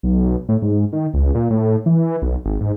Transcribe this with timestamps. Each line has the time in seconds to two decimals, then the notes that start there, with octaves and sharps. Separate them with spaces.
0.03 B1
0.49 A2
0.62 G#2
0.93 D#3
1.14 C#2
1.35 A#2
1.50 A2
1.86 E3
2.22 B1
2.45 G#1
2.61 G#2